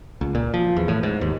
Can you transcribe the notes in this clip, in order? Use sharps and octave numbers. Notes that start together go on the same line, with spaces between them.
C#2
A#2
F3
E2
A2
G#2
D#2